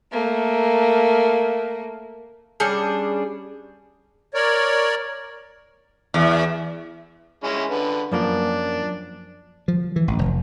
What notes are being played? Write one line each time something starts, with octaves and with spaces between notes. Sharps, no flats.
A3 A#3
G3 C#4 D4 G#4
A#4 C#5 D5
E2
G#3 C#4 E4
D3 B4
F#2 F3 A#3 D4
F3
E3
A1
F1